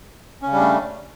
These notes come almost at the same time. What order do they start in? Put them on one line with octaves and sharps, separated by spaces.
C#4 C#3 G3 D4 A3